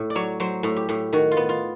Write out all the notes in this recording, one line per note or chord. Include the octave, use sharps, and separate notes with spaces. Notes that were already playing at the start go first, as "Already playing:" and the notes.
Already playing: A2
D5
F#3 C#5
F#3 C5
A2
G4
A2
D#3 F#4
F4
B3
F4